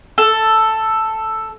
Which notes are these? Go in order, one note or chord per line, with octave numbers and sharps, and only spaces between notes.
A4